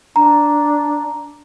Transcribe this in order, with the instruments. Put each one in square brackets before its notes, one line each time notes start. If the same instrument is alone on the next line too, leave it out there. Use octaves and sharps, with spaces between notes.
[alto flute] D4 [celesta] A#5